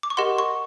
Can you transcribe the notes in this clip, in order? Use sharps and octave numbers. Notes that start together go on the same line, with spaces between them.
D6
C#6
G4 A#4 D#5 F#5 C6
C#6